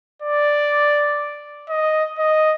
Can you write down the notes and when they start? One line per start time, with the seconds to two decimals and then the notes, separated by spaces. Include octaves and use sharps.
0.22 D5
1.69 D#5
2.19 D#5